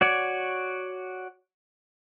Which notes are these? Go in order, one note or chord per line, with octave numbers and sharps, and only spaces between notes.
F#4 C#5 D5